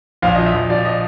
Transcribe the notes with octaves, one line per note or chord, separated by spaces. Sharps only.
A#1 F5
F3 D#5
E5
A#1
F3 D5
D#5